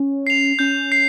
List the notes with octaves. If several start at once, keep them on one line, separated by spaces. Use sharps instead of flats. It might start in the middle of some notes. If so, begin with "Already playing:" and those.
Already playing: C#4
C7 F7
C#4 G6
C7